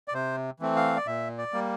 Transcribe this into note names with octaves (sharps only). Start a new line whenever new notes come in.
D5
C3 C5
E3 A3 C4
F5
D5
A#2 E5
D5
G3 A#3